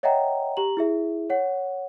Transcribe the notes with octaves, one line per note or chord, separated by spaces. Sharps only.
C#5 D#5 E5 F#5 G5 A#5
G4 A#5 F#7
E4 G#4 E5
C#5 F#5